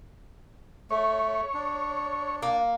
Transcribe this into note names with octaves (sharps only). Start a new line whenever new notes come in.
A3 C#5
D4
A#3